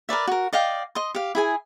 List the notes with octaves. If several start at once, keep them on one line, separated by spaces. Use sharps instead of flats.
A#4 B4 D5 E5
F#4 A#4
D5 D#5 F5 G5
D#5 C6
G4 F5
E4 G#4 G#5